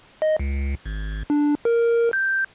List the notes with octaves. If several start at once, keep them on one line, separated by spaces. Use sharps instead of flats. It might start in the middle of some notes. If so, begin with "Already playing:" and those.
D#5
C#2
G#1
D4
A#4
G6